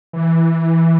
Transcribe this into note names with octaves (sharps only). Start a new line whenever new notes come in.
E3